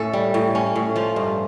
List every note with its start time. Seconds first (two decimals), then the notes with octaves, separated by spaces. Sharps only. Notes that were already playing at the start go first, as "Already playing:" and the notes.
Already playing: A2 C#4 A4
0.13 G3
0.34 A2
0.55 C#4
0.76 A2
0.96 F3 F4
1.16 G2